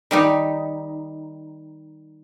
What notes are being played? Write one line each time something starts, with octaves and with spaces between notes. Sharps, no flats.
D#3 G3 D#4